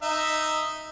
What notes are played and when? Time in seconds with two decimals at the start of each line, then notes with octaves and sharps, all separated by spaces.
0.02 D#4 E5